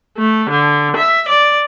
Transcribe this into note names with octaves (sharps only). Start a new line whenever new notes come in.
A3
D3
E5
D5